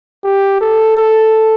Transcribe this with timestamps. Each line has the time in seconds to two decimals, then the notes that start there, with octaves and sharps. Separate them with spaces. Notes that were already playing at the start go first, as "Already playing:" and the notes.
0.24 G4
0.61 A4
0.97 A4